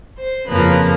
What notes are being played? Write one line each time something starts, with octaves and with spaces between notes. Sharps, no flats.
C5
F2 C#3 F3 A#3 B4